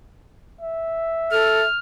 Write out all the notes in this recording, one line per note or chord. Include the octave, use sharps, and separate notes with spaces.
E5
A4 F6